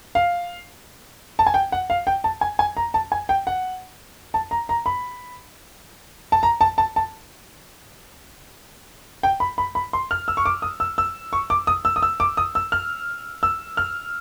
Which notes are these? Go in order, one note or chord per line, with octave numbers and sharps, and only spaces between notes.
F5
A5
G#5
G5
F#5
F5
G5
A5
G#5
G#5
A#5
A5
G#5
G5
F#5
A5
A#5
A#5
B5
A5
A#5
A5
A5
A5
G5
B5
B5
B5
C6
F6
E6
C#6
D6
D#6
E6
E6
C#6
D6
D#6
E6
D#6
E6
D6
D#6
E6
F6
E6
F6